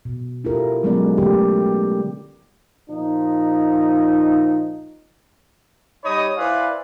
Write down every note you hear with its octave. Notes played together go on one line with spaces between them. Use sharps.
B2
D4 E4 F4 G4 A4 A#4
F#3 G#3 B3 C#4 B4 D5
D3 A3 G4 A4
A#2 F3 D#4
G3 D#4 C#5 D#5 B5 D#6
E4 B4 C5 D5 F5 G#5